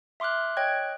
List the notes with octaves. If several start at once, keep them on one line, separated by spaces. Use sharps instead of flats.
E5 C6 D6 F6 F#6
C#5 D#5 G5 F#6 G#6